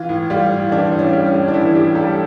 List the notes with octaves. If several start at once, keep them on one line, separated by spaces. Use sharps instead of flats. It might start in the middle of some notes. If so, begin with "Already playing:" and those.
Already playing: E3 F4
A2
G3 F4
A2
E3 D4
A2
C#4
G3
C#4
A2
D4
E3 E4
A2 G4
G3 A4